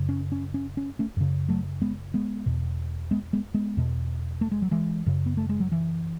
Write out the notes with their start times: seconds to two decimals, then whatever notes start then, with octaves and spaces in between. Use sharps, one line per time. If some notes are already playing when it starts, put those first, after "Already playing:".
Already playing: F#2 C#3
0.09 C#4
0.32 C#4
0.54 C#4
0.77 C#4
0.99 A3 C#4
1.17 F#2 C#3
1.49 F#3 A3
1.82 G#3 B3
2.14 G#3 B3
2.46 E2 B2
3.11 G#3 B3
3.33 G#3 B3
3.54 G#3 B3
3.77 E2 B2
4.41 A3
4.51 G#3
4.62 F#3
4.71 E3 G#3
5.06 F#2 C#3
5.26 B3
5.37 A3
5.49 G#3
5.60 F#3
5.72 E3